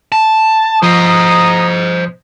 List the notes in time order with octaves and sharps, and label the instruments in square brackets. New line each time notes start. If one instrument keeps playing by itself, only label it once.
[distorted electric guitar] A5
[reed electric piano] F3 [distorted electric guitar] C5 D#5 [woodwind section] A#5 D#6